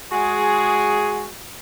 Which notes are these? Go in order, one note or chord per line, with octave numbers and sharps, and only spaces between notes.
G#3 F#4 G#4